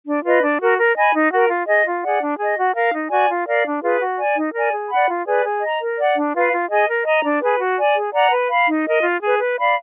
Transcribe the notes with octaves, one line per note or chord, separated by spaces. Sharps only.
D4
F4 B4 D#5
D4
F#4 A#4
A#4
D#5 G#5 B5
D#4
F#4 A#4
F4
G#4 D#5
F4
G#4 D5 F#5
D4
G#4 D#5
F#4
A#4 F5
D#4
F#4 D5 G#5
F4
A#4 D5 F5
D4
F4 G#4 B4
F#4
D5 G#5
D#4
A#4 D5 G#5
G#4
D5 F#5 B5
F4
G#4 B4 D5
G#4
D#5 A#5
A#4
D5 F#5
D4
F4 B4 F5
F4
G#4 D#5
A#4
D#5 A#5
D4
G#4 B4
F#4
D5 G#5
G#4
D5 F#5 A#5
B4
F5 B5
D#4
A#4 D#5
F4
G#4
B4
B4
D5 F5 B5